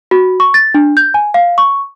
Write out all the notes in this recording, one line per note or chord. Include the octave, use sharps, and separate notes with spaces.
F#4
C#6
A6
D4
G6
G#5
F5
C#6